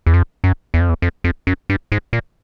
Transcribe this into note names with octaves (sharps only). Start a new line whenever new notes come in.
E2
F2
F#2
E2
F2
E2
F2
F2
F#2
G2
G#2
A#2